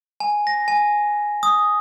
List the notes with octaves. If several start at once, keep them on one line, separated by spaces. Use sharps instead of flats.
G#5
A#6
G#5
D#6